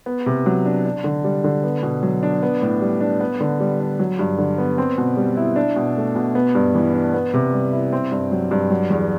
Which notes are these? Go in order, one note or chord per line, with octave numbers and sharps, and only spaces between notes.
B3
C3
F#3
D4
D4
D3
G3
D3
B3
B2
F#3
D4
B3
A2
G3
D4
B3
D3
G3
D4
F#3
G2
D3
B3
C4
B2
G3
E4
D4
B2
A3
B2
B3
G2
E3
D4
B3
C3
G3
E4
C4
G2
F#3
G2
F#3
E2